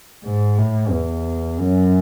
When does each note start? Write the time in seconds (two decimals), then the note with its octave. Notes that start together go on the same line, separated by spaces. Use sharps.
0.24 G#2
0.58 A2
0.91 E2
1.58 F#2